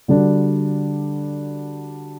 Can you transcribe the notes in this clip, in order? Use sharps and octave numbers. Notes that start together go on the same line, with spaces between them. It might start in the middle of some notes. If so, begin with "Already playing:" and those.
D3 G3 D4 F#4